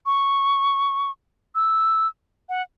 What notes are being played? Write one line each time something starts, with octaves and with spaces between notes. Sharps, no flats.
C#6
E6
F#5